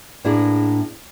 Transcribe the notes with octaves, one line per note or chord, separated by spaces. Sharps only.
A2 A#3 D4 E4 G#4